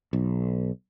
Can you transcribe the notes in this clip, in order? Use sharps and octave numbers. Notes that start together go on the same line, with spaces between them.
B1